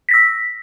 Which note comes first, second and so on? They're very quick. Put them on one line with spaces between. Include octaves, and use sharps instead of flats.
B6 A#6 E6